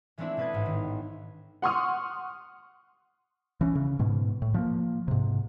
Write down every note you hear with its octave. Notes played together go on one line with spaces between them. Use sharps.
E3 G#3 A3 C4 D4 E4
B2 A4 B4 D#6 G#6
A1 G#2
D#3
F#5 C6 C#6 D#6 F6
E3 C#4
C#3
G#2 B2
A2
F3 G#3 A#3
G#2 C3